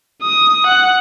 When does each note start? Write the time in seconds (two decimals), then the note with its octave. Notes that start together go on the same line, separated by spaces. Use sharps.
0.23 D#6
0.67 F#5